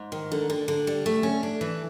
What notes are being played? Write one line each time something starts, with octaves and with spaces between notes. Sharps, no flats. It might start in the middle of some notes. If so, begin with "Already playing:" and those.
Already playing: G#2
D#3
D3
D3
D3
G3
A3
C#4
D4
E3